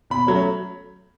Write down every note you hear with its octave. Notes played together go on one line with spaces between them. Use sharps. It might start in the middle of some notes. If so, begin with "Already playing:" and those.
B2 B5
F#3 A3 C#4